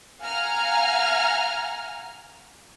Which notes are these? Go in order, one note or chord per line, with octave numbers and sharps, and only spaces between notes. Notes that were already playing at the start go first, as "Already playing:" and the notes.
F5 F#5 G#5 A#5 F6